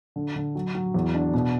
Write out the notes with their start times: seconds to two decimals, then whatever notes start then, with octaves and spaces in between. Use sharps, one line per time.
0.16 D3
0.35 D3
0.55 F#3
0.75 F#3
0.94 E2
1.14 D4
1.34 B2